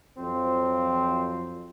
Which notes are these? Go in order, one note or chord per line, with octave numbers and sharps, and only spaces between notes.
F2 F3 F#3 C4